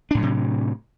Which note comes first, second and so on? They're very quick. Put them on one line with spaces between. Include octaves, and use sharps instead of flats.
D4 A2 F#3 C3